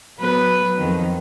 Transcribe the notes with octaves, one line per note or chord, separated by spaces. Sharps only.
F#3 B3 B4
F2 D#3